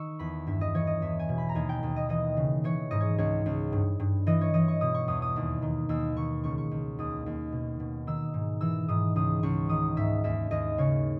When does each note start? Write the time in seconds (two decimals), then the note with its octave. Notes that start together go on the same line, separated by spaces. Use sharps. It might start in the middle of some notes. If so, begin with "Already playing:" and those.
Already playing: D#3 C#6 E6
0.19 E2 B5
0.47 G2 E5
0.61 D#5
0.74 E3 C#5
0.87 D#5
1.02 E2 E5
1.19 G#5
1.29 B2
1.38 B5
1.49 A#5
1.55 D#2 G#5
1.69 G5
1.83 D#2
1.96 D#5
2.09 E3 D#5
2.37 C#3
2.64 E3 C#5
2.91 G#2 D#5
3.00 C#5
3.18 C#2 C#5
3.46 C#2
3.72 G2
4.00 G2
4.27 E3 D#5
4.41 C#5
4.54 E3 D#5
4.68 C#6
4.81 B2 D#6
4.94 C#6
5.08 E2 D#6
5.22 D#6
5.36 D#2
5.62 D#3
5.89 D#2 E6
6.16 D#3 C#6
6.44 C#2 C#6
6.58 C#6
6.71 C#2
6.99 D#2 D#6
7.26 D#2
7.52 B2
7.80 B2
8.07 D#3 E6
8.34 G#2
8.61 E3 E6
8.88 G#2 D#6
9.16 C#2 D#6
9.43 C#2 C#6
9.69 D#3 D#6
9.97 G#2 E5
10.24 D#2 E5
10.51 D#2 D#5
10.78 C#3 C#5